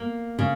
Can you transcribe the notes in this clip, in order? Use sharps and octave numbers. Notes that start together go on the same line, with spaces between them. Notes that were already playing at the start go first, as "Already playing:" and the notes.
Already playing: A#3
C#3